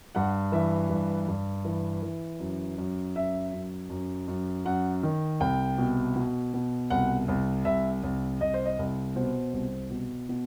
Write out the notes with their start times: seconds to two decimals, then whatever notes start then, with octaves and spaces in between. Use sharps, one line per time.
0.15 G2 F#5
0.52 E3 E5
0.90 G2
1.28 G2
1.65 E3
2.03 E3
2.40 F#2
2.78 F#2
3.16 F#2 E5
3.53 F#2
3.90 F#2
4.28 F#2
4.65 F#2 F#5
5.03 D#3
5.40 C2 G5
5.78 B2
6.16 B2
6.54 B2
6.90 C2 F#5
7.28 C2
7.65 C2 E5
8.03 C2
8.41 C2 D#5
8.54 C5
8.65 D#5
8.79 C2
9.16 B2 C5
9.53 C2
9.90 B2
10.29 B2